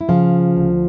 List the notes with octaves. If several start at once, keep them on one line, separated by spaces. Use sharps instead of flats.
E4
C#3 F3 F4
D2